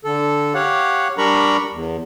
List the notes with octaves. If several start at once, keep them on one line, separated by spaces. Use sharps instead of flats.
D3 A4
G4 C#5 F5 F#5
G3 D4 A#4 A#5 B5 C#6
E2